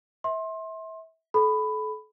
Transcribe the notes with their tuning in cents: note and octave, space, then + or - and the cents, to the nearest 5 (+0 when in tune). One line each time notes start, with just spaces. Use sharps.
E5 -30 C6 +25
A4 -35 B5 +10